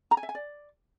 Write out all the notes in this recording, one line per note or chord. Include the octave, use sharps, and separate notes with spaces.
A#5
G#5
E5
G#5
D5